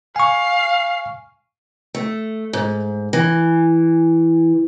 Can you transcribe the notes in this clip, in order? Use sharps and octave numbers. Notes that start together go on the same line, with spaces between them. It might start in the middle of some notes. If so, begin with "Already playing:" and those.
F5 G#5 C#6
A3
G#2
E3